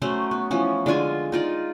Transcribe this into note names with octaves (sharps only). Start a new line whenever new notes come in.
F#3 A3 C#4 C5
B3
E3 F3 C#4
D3 G#3 F4 G#5
D#4 F4 D5